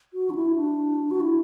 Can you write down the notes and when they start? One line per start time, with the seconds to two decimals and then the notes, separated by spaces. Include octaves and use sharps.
0.14 F#4
0.30 D4
0.35 E4
0.56 D4
1.11 F#4
1.20 E4